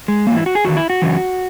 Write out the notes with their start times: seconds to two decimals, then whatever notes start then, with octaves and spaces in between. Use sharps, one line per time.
0.08 G#3
0.27 G#2 E3 A#3
0.36 E4
0.46 F#4
0.55 G#4
0.65 E2 D#3 F#4
0.77 E4
0.90 F#4
1.02 F#2 C#3 E3